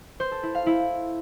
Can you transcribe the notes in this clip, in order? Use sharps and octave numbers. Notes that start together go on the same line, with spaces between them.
C5
A4
E4
F5
E4